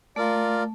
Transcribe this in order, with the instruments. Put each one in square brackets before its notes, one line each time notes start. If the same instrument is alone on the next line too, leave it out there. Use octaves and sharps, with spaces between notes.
[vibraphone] A3 [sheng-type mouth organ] F4 A#4 D5